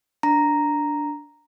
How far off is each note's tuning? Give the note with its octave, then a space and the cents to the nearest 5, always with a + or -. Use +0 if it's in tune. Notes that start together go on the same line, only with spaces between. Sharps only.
D4 -5 A#5 +0